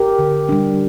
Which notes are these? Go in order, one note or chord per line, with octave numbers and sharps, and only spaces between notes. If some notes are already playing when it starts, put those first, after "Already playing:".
Already playing: G4 A#4
D3
G3 D4